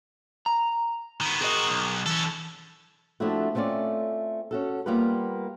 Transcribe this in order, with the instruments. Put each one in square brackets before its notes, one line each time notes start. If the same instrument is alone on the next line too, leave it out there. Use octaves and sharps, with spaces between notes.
[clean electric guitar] A#5
[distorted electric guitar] D#3 B3
[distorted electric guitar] C4 F#4 [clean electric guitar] G#4 A#4 D#5
[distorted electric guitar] B1
[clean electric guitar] E3 [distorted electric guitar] C#4 A4
[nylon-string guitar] F3 A3 C4 D4 E4 F#4
A3 C4 C#4 F4 D5
C#4 F#4 A4
G3 A#3 B3 F4 G4 B4